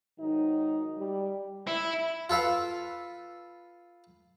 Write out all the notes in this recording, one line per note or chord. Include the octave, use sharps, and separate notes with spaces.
G#2 D#3 F#3 D#4
G3
E4
F4 A4 B4 F5